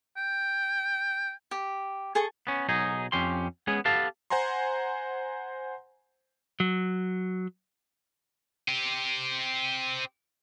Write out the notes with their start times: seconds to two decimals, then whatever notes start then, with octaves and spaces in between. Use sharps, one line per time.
0.17 G5
1.51 G4
2.15 G#4 A4 A5 C#6
2.47 B3 C#4
2.69 B1 F#3 D#4 G#4
3.12 F2 C#4 G4 C6
3.67 G#3 B3 C#4 G#4
3.85 B3 G4 A4 F5 A5
4.30 C5 F#5 G#5 A#5 C6
6.60 F#3
8.68 C4 G4